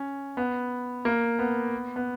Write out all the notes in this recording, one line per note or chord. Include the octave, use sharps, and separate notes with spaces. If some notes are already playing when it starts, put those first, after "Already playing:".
Already playing: C#4
B3
A#3
B3
B3